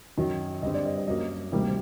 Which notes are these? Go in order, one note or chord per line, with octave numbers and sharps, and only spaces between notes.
F#2 D#3 F#3
G2 D3 G3 C4 D#5
D5
D#5
D#5
F#2 F#3 A#3 D#5
D2 C3 D#3 G3 A#3